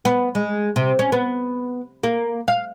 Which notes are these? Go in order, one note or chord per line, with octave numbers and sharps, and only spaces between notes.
B3
G#3
C3
C#4
B3
A#3
F5